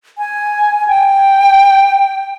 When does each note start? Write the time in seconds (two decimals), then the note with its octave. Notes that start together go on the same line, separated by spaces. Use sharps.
0.18 G#5
0.88 G5